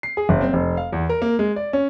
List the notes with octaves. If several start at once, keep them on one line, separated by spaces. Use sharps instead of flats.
C7
G#4
F#1
C4
F1
F5
E2
A#4
A#3
G#3
D5
C#4